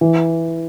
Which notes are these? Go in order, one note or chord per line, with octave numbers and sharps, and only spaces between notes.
E3